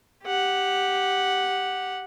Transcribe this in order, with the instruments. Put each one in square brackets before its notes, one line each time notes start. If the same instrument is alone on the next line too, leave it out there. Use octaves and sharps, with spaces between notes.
[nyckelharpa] G4 F#5